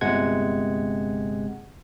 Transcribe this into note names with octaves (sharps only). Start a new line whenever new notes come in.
G1 C3 G#3 F#5 G#6